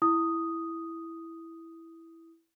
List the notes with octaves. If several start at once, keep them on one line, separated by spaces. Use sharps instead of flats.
E4 D#6